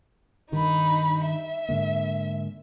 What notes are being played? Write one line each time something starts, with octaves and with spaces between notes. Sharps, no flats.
G2 D#3 D#4 B5
E5
G#2 D3 A#3